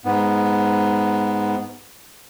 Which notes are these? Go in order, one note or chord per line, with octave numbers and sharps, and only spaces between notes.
G#2 B3